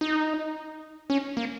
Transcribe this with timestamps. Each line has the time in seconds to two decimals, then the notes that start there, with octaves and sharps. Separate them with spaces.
0.01 D#4
1.10 C#4
1.37 A#3